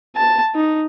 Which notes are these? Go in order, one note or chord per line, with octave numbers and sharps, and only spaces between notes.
A5
D#4